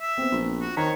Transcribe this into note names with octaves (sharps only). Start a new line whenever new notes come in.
E5
B3 C4
A#1
F#4
D#3 C5 C#5 A#5 B6